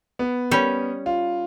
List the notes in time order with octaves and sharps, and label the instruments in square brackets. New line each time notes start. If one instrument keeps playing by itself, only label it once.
[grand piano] B3
[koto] G3 C#4
[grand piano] F4